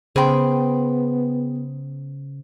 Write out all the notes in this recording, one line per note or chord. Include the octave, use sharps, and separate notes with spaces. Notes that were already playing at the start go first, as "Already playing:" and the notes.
C#3 B3 G#4 C5 G5 B5 C6